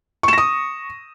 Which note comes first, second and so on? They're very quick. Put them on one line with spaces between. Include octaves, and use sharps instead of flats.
C#6 E7 A#6 D#6